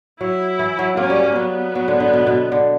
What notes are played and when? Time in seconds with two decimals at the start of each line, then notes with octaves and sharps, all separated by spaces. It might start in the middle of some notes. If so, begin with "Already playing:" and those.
0.20 F#3 E4
0.59 E3
0.79 F#3
0.97 A#3 C#4
1.10 G3
1.23 A#3
1.36 F#3 B3
1.75 F#3
1.88 D3
2.00 D3
2.14 B2
2.27 B2
2.52 D3